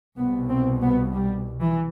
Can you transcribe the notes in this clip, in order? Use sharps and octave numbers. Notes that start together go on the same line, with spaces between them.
C2 B2 B3
C4
B3
G3
E3